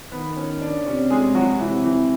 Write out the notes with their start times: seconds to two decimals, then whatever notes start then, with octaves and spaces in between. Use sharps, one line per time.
0.12 D#3 B3 B4
0.37 C#4 C#5
0.61 D4 D5
0.86 C3 C#4 C#5
1.10 G#3 G#4
1.35 F#3 F#4
1.60 C3 E3 E4
1.84 E3 E4